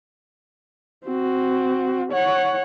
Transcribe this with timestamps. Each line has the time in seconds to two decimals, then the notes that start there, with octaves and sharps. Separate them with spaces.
1.06 C4 F#4
2.13 C#5 F#5